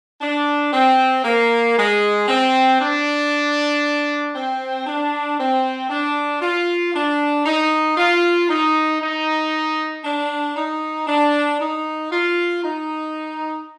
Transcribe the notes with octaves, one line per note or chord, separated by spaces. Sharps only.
D4
C4
A#3
G#3
C4
D4
C4
D4
C4
D4
F4
D4
D#4
F4
D#4
D#4
D4
D#4
D4
D#4
F4
D#4